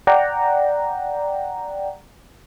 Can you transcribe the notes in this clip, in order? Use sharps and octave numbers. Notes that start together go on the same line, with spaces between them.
D5 F#5 G5 A#5